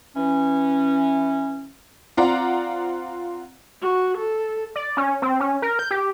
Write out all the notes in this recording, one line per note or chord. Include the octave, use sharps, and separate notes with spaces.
E3 C#4
C4 F4 D5 F#5 A#5
F#4
A4
D5
C#4
C4
C#4
A#4
G6
G4